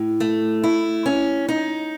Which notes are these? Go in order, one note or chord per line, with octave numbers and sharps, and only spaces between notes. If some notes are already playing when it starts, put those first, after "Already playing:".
Already playing: A2
A3
E4
C#4
D#4